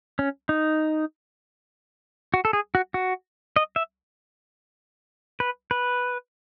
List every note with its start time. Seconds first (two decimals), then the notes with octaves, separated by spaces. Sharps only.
0.19 C#4
0.49 D#4
2.34 F#4
2.45 A4
2.53 G#4
2.75 F#4
2.94 F#4
3.56 D#5
3.76 E5
5.40 B4
5.71 B4